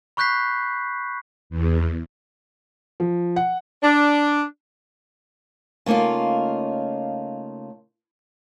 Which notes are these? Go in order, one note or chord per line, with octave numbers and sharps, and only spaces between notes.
B5 C#6 F#6 G6 B6 C7
E2
F3
F#5
D4
C#3 A3 A#3 D#4 F4